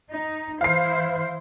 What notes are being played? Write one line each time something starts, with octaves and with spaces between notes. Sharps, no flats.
D#4
E3 E4 C5 F5 C7